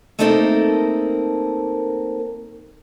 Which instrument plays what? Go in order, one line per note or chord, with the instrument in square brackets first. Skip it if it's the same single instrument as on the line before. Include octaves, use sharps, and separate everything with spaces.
[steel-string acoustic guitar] A3 A#3 C4 D#4 A4 A#4